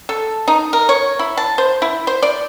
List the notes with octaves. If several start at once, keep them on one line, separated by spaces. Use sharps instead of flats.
A4
D#4
A#4
C#5
E4
A5
C5
E4
C5
D5